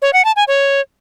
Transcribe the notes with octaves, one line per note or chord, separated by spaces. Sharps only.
C#5
F#5
A5
G#5
C#5